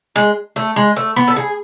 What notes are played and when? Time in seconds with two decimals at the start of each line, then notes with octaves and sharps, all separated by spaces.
0.16 G#3
0.56 A3
0.76 G#3
0.96 A3
1.16 B3
1.28 A4
1.36 G#4